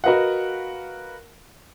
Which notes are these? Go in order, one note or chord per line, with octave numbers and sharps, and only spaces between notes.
F#4 A#4 B4 D#5 F5 F#5